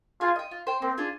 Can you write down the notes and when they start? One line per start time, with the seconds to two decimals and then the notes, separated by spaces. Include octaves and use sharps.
0.21 F4 G#4
0.36 D#5 G5
0.51 F4
0.67 C5 G5
0.82 A#3 C4
0.98 D4 F4 G#4